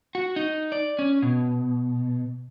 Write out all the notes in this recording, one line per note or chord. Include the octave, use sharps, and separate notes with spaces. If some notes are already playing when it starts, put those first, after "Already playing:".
F#4
D#4
D5
C#4
B2